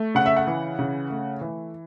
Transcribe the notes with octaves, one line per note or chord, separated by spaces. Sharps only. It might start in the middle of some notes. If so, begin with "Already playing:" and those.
Already playing: A3
C#3 F#5
E5
F#5
E3
C#3
A3
E3